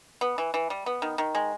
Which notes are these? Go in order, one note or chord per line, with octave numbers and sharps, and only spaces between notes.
B3
E3
E3
G3
B3
D#3
D#3
G#3